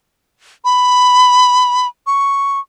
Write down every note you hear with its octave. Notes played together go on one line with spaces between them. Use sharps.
B5
C#6